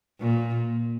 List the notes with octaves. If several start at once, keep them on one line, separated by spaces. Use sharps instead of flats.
A#2